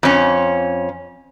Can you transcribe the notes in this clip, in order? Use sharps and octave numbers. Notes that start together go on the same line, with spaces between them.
F2 C#4